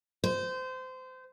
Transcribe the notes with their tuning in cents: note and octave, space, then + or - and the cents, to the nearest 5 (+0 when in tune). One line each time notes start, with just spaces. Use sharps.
C5 -25